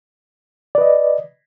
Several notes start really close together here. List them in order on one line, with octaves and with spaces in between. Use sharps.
D5 B4 D#5